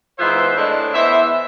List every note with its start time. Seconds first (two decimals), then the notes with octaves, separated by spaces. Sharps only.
0.18 G#2 E3 G#3 B3 F4 C5 E5
0.56 A2 G#3 D4
0.94 E3 B3 E4 C5 E5